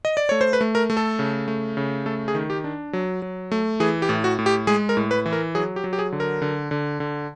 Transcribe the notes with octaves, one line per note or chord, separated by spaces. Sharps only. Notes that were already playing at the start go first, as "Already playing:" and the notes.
D#5
D5
A3 C#5
C5
B4
A3
A#4
A3
A4
C#3
A3
C#3
A3 A4
G#4
D#3
G4
D4
F#3
F#3
A3
E3 G#4
G4
A2
F#4
A2
G4
G#3 G#4
A#4
A2
B4
E3
A#4
F#3 G#4
G4
F#3
G4
G#4
D3
A#4
D3
D3
D3